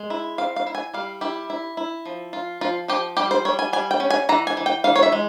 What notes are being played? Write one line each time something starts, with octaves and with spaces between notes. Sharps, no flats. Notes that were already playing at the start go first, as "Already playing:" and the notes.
Already playing: G#3
E4
C4 F5
F5
E4
G#5
G3 F5
E4 G4
E4
E4
F3
F4
F3 F4
F3 G4
G3 G4
C5
G3 C#5
G#5
G3 G#5
G5
C#4
G#5
E3 A#5
G#5
E3
G5
E3 F5
C#5
E5
G#3